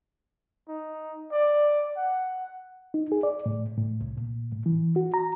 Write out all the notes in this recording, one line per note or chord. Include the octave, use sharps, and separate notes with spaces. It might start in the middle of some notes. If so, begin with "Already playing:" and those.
D#4
D5
F#5
D#4
G#4
D5
A2
A2
C2
A#2
A2
E3
F#4
A#5